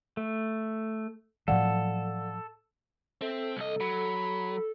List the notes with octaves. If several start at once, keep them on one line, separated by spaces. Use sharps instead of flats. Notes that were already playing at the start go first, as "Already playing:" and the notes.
A3
A2 F3 F#3 A4 D5 F5 F#5
C4 A4 E5
C2 D#5
F#3 B5